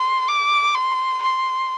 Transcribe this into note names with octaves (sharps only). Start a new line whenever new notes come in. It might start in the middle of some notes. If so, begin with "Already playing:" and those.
Already playing: C6
D6
C6
C6